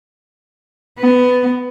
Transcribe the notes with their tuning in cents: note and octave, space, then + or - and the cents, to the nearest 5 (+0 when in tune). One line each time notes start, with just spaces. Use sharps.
B3 +15